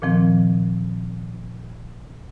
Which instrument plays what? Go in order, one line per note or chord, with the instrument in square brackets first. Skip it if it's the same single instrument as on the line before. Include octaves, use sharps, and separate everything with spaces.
[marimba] A#2 D#3 F3 C4